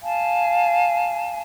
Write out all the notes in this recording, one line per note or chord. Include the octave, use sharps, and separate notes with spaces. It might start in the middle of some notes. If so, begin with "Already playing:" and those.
F5 G#5 A5